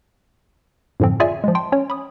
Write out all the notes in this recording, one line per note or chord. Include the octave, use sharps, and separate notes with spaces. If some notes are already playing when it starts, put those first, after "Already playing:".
F#2 A2 D3 F3 C4
F4 G#4 C#5 D5 E5 G#5
F3 G#3
G5 A5 C6
C#4 C#5
B5 D#6